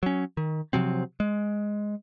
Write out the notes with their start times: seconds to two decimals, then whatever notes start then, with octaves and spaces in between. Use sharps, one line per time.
0.03 F#3 C#4
0.37 D#3
0.73 C3 F3 F#3 C4
1.20 G#3